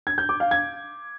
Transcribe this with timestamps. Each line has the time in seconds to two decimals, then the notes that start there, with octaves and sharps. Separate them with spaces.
0.07 G#6
0.18 G6
0.29 D6
0.40 F5
0.51 G#6